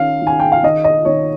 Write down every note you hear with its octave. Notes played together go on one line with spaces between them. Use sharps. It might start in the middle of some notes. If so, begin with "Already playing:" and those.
Already playing: D#3 C#4 F5
D#3 G#5
G5
F5
D#3 D#5
D#5
D#3 C#5